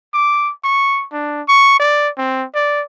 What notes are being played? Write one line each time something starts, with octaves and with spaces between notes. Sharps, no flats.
D6
C#6
D4
C#6
D5
C4
D5